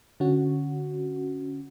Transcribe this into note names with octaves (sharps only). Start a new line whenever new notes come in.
D3 C#4 F#4